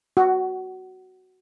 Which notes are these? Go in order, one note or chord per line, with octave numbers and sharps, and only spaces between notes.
F#4